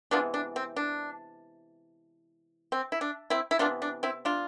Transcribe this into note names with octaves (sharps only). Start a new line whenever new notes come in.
C3 E3 G#3 B3 D4 F4
D4
C4
D4
C4
E4
D4
C4 E4
E4
C3 E3 B3 D4 F4
D4
C4 E4
D4 F4